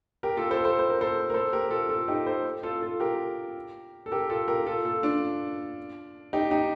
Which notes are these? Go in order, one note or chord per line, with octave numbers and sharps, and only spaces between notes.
G4 A#4
F4 A4
A4 C5
A4 C5
C5
A#4
A4 C5
A#4
A4 C5
G4 A#4
F4 A4
F4 A4
D#4 G4
A4 C5
F4 A4
F4 A4
G4 A#4
A4
G4 A#4
F4 A4
G4 A#4
F4 A4
F4 A4
D4 F4
D#4 G4
D#4 G4